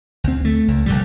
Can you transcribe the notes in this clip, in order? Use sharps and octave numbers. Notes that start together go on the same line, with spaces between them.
D2 C4
A3
C#2
A#1 D3 G3